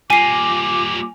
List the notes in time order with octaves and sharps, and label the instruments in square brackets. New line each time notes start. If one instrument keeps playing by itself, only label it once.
[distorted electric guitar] G3 A#3 [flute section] F4 D6 [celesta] G#5 [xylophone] C7 D#7